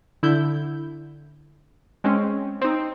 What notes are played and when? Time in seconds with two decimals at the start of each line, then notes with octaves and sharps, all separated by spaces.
0.23 D3 E4 G6
2.04 G#3 C4 C#4
2.61 C4 D#4